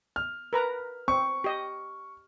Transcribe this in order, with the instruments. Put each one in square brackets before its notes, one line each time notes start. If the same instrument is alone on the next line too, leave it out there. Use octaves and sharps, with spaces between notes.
[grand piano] F6
[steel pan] A#4 B4 A#5
[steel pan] C4 [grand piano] C#6
[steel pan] G4 D#5